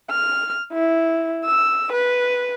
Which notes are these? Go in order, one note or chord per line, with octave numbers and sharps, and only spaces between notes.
F6
E4
E6
B4